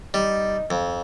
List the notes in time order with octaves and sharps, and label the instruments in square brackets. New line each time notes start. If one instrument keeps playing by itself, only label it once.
[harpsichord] G3 [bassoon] D#4
[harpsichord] F2